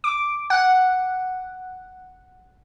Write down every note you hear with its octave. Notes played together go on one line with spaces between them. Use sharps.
D6
F#5